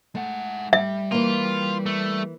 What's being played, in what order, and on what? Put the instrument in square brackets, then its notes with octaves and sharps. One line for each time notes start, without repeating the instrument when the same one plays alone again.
[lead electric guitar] G#3 F#5 [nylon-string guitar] A3
[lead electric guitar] G3 [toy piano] E5
[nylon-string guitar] E3 A#3 [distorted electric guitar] F4
[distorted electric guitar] A3